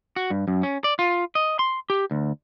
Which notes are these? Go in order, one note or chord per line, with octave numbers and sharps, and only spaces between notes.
F#4
G2
F#2
C#4
D5
F4
D#5
C6
G4
D2